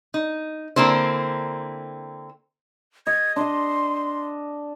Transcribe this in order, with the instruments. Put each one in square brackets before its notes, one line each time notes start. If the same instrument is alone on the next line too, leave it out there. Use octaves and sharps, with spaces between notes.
[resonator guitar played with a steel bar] D#4
D3 A#3 C4 E4 C5
[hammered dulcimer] D#5 [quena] G#6
[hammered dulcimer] D4 D#5 [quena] C6